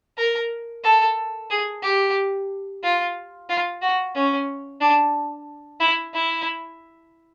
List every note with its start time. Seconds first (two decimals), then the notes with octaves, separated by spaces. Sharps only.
0.17 A#4
0.84 A4
1.50 G#4
1.83 G4
2.83 F4
3.49 F4
3.81 F#4
4.15 C#4
4.81 D4
5.80 E4
6.14 E4